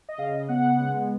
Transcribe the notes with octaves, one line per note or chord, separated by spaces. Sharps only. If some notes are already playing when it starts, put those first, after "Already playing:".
D#5
C#3 F5
D#5
B3 F#5
G#3